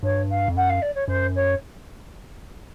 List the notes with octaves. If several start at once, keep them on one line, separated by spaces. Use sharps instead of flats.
G2 C#5
F5
F2
F#2 F#5
F5
D5
C#5
F#2 C5
C#5